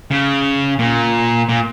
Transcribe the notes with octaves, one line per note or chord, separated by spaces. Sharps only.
C#3
A#2
A#2